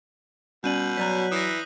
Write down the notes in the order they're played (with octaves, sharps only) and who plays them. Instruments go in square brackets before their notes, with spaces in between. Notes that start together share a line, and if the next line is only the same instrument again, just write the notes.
[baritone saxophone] B2 [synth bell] G3 C#4 D5 [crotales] G6 D#7 F#7
[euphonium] F#3 [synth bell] C#5 D5 A#5 [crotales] F#6 B6
[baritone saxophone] E3 [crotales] D#6 A#6